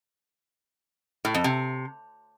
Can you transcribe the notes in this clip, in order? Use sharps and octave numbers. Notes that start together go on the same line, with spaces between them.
A2
F2
C3